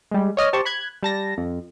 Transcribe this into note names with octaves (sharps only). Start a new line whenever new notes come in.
G3 G#3
C#5 D#5 F6
G4 C5 A5 C#6
B5 F#6 G#6
G3 A5 A#6
F2